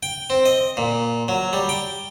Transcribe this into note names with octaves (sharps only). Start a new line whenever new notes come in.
G5
C4
D#5
A#2
F#3
G3
G5